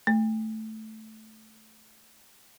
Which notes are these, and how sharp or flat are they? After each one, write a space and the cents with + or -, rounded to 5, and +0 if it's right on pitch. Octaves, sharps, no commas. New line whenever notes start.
A3 -5